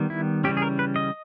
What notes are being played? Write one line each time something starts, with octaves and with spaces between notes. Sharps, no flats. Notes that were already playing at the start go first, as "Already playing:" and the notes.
Already playing: D#3 G3 B3
E4
C#3 E3 G3 C#4 G4
G#4
A#4
B4
D#5